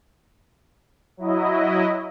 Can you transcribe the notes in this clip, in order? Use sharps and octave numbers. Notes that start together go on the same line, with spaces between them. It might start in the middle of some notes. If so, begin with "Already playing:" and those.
F#3 E4 D#5